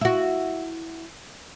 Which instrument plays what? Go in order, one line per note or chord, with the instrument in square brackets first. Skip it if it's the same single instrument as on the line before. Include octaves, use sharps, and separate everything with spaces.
[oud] E4 F#4